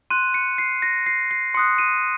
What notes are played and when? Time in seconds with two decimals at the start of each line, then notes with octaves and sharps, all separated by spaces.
0.10 C6 F#6 D#7
0.34 C#7
0.58 C7
0.82 A#6
1.06 C7
1.31 C7
1.54 C6 D#6 F#6 C#7
1.78 D#7